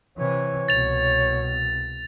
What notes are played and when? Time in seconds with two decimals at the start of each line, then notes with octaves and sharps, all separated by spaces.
0.18 C3 E3 C#5
0.68 C2 B2 A6 F7